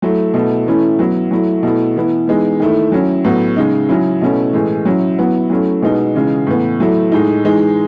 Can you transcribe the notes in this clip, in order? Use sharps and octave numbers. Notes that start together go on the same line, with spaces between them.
F#3 A3 E4
B2 A3 E4
E3 A3 C#4 E4
F#3 B3 E4
F#3 A3 E4
B2 A3 E4
E3 B3 E4
E3 G#3 B3 D#4
D#3 A3 E4
F#3 C#4 E4
A2 F#3 B3
C#3 G#3 D#4
C#3 F#3 C#4 E4
B2 A3 C#4 E4
A2 E3 G#3
F#3 C#4 E4
F#3 B3 E4
F#3 A3 C#4 E4
B2 G#3 B3 D#4
C#3 E3 G#3
A2 E3 B3
F#3 A3 E4
A2 G#3 D#4
E3 G#3 D#4